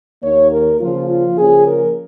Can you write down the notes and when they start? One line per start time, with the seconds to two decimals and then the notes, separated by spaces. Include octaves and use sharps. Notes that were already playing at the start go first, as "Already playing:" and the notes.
0.22 D#2 D#3 A#3 C#5
0.51 A#4
0.80 C#3 F3 A#3 F4
1.09 F4
1.38 C#3 F3 A#3 C#4 G#4
1.66 A#4